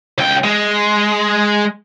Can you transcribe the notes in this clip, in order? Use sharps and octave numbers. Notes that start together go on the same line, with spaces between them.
C#2 G5
G#3